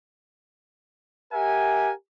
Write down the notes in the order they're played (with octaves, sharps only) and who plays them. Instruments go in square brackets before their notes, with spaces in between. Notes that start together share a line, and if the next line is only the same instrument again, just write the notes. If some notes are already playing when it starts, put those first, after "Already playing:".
[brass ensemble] G4 A#4 E5 F#5 G#5